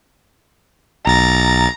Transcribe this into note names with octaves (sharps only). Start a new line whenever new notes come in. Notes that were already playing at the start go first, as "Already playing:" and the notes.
B1 A#5 A6